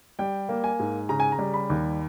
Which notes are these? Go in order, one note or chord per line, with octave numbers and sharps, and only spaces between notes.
G3 G5
A#3
G#5
G#2
C#3 A#5
G#5
A#5
G3
B5
D#2